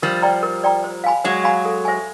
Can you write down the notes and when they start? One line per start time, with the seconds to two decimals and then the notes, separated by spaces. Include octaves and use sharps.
0.02 F3 G3 A#4
0.22 D5 G5 A#5
0.43 A#4
0.64 D5 G5 A#5
0.84 C5
1.04 F5 G#5 B5
1.24 F#3 G#3 C5
1.44 F5 G#5 B5
1.65 A4
1.85 C5 E5 G#5